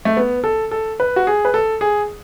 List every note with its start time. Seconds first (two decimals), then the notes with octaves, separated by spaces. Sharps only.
0.05 A3
0.17 B3
0.44 A4
0.71 A4
1.00 B4
1.16 F#4
1.27 G#4
1.45 B4
1.54 A4
1.81 G#4